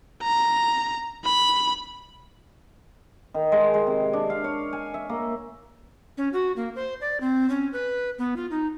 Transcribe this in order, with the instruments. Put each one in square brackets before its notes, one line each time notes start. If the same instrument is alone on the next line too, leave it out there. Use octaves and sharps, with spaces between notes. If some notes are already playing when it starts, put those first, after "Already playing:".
[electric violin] A#5
B5
[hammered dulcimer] D#3
G#3
G#3
C3
D4
F5
C#5
G#5
E5
A#3
[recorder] C#4
F#4
A#3
C5
D5
C4
C#4
B4
B3
F4
D#4